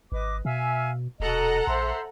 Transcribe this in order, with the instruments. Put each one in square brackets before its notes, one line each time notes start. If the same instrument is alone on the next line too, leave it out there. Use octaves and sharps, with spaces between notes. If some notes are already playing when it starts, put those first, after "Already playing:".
[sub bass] G#1 [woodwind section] B4 D#5 D6
[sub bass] B2 [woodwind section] E5 F5 G#5
[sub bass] D#1 [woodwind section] B2 D#5 [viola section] A4 F#5 A#5
[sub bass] A#1 [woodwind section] C5 E5 C6